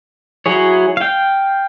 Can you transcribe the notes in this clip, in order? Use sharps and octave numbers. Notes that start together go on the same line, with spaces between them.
F#3 E4 G#4 C#5
F5 G5